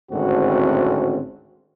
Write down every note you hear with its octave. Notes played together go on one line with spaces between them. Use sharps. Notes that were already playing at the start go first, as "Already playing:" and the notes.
G#1 D2 A2 C4 C#4 F#4